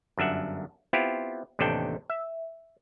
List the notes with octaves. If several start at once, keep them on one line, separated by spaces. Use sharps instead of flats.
G1 F#2 D4 E5 F#5
B3 C4 E4 F4 G4
A1 D#2 C3 D4 A4 G5
E5